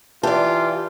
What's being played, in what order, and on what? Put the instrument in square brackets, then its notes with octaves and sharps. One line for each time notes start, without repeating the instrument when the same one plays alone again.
[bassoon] E3 [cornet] F4 [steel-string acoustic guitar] G4 D5 [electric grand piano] A5